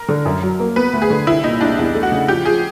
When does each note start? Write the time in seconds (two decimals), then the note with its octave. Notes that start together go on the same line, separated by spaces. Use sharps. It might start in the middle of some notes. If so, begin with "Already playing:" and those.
Already playing: A#4
0.08 D3
0.25 F#2
0.42 F#3
0.59 A#3
0.76 B3 B4
0.93 D2
1.02 G#4
1.10 D3
1.26 C2 E4
1.44 A#2 D#4
1.60 C2 D4
1.78 E2
1.94 A3
2.03 F#4
2.12 C#3
2.28 F3 G4
2.45 F3 G#4